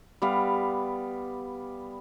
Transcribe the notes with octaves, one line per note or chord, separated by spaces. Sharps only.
G3 B3 F5